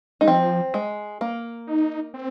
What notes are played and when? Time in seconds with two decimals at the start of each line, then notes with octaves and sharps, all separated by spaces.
0.21 G#3 D#4
0.28 F3 C4
0.74 G#3
1.21 A#3
1.67 D#4
2.14 C4